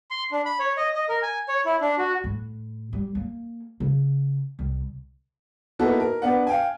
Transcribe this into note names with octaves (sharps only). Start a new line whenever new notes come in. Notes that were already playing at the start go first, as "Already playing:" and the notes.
C6
D4
B5
C#5
D#5
D#5
A#4
G#5
C#5
E4
D4
F#4
A2
G3
A#3
C#3
C2
A#3 B3 D#4 E4 F#4 A4
A#4
B3 D4 F#5
F5 G5 G#5